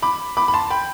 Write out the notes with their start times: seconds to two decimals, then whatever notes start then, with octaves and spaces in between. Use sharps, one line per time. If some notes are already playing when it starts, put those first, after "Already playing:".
0.02 B5 D6
0.37 B5 D6
0.48 B5
0.54 A5 C6
0.70 G5 B5